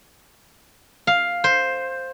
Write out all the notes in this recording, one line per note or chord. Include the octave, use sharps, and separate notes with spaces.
F5
C5